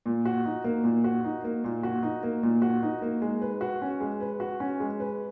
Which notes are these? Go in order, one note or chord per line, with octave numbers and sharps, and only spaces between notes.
A#2
F#4
D#4
A#3
A#2
F#4
D#4
A#3
A#2
F#4
D#4
A#3
A#2
F#4
D#4
A#3
G#3
B4
F#4
C#4
G#3
B4
F#4
C#4
G#3
B4